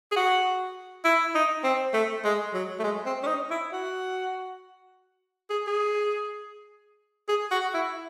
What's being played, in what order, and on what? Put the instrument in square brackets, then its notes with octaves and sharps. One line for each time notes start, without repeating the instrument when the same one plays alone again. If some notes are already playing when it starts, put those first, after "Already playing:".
[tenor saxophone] G#4
F#4
E4
D#4
C4
A3
G#3
F#3
A3
G#3
C4
C#4
D#4
E4
F#4
G#4
G#4
G#4
F#4
E4